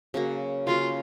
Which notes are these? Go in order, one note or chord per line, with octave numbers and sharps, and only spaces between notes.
C#3 F#3 A#3
C#3 F#3 A#3 F4